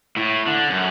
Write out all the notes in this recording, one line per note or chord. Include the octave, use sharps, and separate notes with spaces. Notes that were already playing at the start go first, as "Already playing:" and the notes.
A2
D3
F#2